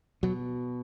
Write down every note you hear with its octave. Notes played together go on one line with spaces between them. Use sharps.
B2 F#3